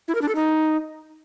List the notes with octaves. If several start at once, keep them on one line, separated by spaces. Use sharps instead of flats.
E4
A#4
D4
A4
D#4